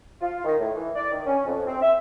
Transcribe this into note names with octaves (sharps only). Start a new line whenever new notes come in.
F4
D#3
A2
E3
D5
D#3
C#4
F2
C4
E5